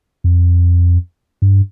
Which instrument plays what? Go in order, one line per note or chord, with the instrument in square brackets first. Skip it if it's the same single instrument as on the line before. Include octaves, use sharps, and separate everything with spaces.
[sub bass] F2
G2